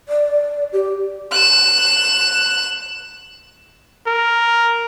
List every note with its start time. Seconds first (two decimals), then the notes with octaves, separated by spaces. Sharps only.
0.08 D5
0.73 G4
1.31 F#6 E7
4.07 A#4